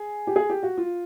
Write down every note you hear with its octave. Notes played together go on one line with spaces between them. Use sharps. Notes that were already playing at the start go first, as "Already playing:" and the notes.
Already playing: G#4
G4
G#4
G4
F#4
F4